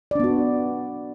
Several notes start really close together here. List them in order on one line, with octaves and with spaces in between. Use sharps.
D5 D4 B3 F#4